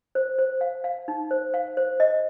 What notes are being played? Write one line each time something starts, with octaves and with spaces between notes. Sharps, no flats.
C5
C5
F5
F5
D#4
C5
F5
C5
D#5